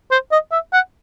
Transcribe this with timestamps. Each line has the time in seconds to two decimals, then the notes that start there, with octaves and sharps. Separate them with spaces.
0.11 C5
0.32 D#5
0.52 E5
0.73 F#5